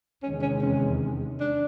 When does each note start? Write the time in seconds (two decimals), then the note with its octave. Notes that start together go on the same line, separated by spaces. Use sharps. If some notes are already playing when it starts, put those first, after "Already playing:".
0.23 E2 C3 D#3 G#3 C#4
0.42 C#4
0.61 C#4
1.40 D4